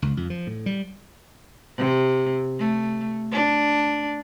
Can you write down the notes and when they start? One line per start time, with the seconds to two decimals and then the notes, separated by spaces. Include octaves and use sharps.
0.02 C#2
0.17 F2
0.30 F3
0.47 A2
0.66 G3
1.78 C3
2.59 A3
3.33 D4